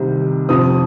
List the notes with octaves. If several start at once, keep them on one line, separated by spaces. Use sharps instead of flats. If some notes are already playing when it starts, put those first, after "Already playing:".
Already playing: C2 C3 D#3 G3
F2 C3 F3 D#6